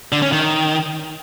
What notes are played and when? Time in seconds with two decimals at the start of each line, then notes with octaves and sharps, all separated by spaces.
0.12 D3
0.22 C#4
0.32 D#3